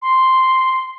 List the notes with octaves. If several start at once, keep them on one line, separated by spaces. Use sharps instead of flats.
C6